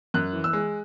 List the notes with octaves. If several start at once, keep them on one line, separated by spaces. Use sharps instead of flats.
F#2 F#6
E3
E6
G#3